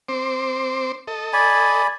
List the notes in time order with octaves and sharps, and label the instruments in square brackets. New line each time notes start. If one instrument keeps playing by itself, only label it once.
[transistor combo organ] C4 C5 D6
A4 D#5
[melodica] D5 G#5 B5